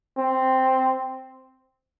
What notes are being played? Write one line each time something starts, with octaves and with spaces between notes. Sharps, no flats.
C4